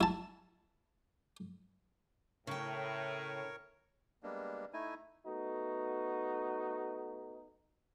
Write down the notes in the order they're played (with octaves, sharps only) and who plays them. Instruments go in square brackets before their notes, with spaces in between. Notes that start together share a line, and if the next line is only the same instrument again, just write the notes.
[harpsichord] E4 A5
[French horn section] A2 [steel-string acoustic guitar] C#3 G5 [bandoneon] A#4 C#5 C#6
[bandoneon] G3 G#3 A#3 B3 D4
A3 D#4 E4 G#5
[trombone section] A3 B3 D#4 F#4